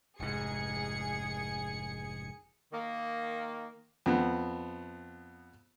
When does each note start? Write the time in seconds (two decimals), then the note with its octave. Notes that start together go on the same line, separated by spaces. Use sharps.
0.20 F1 G#2 G#4 C#7
2.72 D#3 A#3
4.06 F2 B3